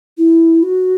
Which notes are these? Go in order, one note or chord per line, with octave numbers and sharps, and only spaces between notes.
E4
F#4